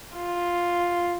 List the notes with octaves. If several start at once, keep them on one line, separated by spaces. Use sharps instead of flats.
F4